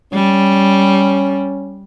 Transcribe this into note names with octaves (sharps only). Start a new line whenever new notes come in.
G3 C#4